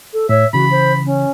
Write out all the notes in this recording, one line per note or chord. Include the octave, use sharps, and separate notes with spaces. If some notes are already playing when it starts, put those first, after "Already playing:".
A4
A2 C#5 E5
C#3 E3 F#4 B5
C5
C#4